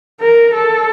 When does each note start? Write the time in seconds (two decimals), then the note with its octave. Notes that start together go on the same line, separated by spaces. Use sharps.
0.20 A#4
0.54 A4